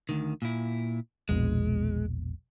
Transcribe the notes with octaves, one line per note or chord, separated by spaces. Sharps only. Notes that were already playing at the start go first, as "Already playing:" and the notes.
D2 D#3
A#2 E4
E1 A#1 B2 G#3